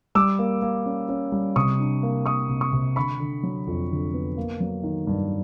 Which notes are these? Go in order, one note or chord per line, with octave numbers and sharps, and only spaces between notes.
G3 D6 E6
A#3
A#3
C#4
C#4
G3
C3 C#6 D#6
D4
A#3
A#3 C#6 D#6
C3
C#6 D#6
C3
D3 B5 C#6
D3
F#3
F2
D3
B3
A#3
F#3
D#3
G2